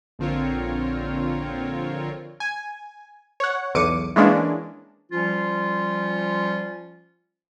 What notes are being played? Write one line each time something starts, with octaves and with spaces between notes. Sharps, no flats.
A#1 D3 C4 F4 A#4 C#5
G#5
C#5 F#5
B1 E2 D6 C#7 D#7
E3 G#3 A#3 C#4 D4
F3 G3 C#4 F4